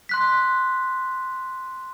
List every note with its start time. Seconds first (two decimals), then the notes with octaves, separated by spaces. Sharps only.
0.09 C6 F#6 B6